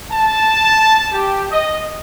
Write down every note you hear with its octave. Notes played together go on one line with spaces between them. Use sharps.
A5
G4
D#5